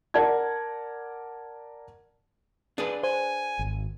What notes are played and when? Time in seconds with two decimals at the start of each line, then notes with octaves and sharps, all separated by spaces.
0.14 A#4 D5 F#5 A5 G#6
2.78 D4 G#4 B4
3.03 C5 G#5
3.59 G#1